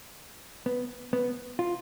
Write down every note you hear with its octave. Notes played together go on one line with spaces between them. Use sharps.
B3
B3
F4